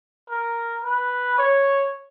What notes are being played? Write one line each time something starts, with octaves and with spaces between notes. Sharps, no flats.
A#4
B4
C#5